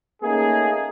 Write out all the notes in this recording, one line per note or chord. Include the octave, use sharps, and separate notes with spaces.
A3 A#3 C#4 D#4 G#4